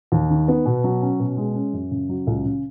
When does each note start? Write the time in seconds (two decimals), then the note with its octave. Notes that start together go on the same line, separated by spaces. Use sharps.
0.12 D#2
0.30 D#3
0.48 B3
0.66 B2
0.84 F#3
1.02 C#4
1.20 B2
1.37 G#3
1.55 C#4
1.73 F#2
1.91 C#3
2.09 F#3
2.27 C#2
2.45 C#3